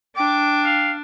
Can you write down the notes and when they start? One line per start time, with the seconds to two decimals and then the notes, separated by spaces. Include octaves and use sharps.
0.16 D4 G5 D6
0.65 F5